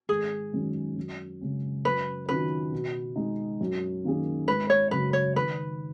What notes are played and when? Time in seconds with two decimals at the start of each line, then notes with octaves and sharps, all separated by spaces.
0.09 G#1 G#4
0.53 F#2 D#3 G#3 C#4
0.97 F#2
1.41 C#3 G#3 C#4
1.85 F#2 B4
2.29 D#3 F#3 C#4 F4 B4
2.72 B2
3.16 G#3 D#4
3.61 F#2
4.05 D#3 A#3 C#4 G#4
4.48 G#1 B4
4.70 C#5
4.91 F#2 C#3 F#3 B4
5.13 C#5
5.35 D#3 B4